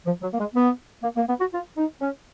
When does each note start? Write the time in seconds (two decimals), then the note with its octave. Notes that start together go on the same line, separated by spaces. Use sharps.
0.06 F3
0.22 F#3
0.32 A#3
0.39 G#3
0.54 B3
1.03 A#3
1.16 A#3
1.28 B3
1.39 F#4
1.53 F4
1.77 D#4
2.01 C#4